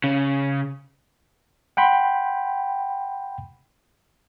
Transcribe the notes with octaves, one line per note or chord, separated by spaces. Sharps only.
C#3
F#5 G5 B5 C6